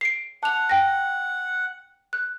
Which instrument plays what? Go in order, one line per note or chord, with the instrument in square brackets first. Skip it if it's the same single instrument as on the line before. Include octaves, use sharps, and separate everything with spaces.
[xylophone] C7 D7
[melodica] F#5 [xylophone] A5 F7
[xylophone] G5 A#6
F#6